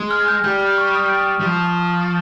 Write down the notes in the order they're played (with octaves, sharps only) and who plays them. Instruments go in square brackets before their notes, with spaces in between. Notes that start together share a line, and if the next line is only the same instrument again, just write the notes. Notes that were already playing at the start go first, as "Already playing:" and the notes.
Already playing: [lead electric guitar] G#3
[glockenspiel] F6
G#6
G6
[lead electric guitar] G3 [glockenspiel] G6
[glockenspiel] F6
C#6
D#6
F6
D#6
[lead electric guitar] G3
F3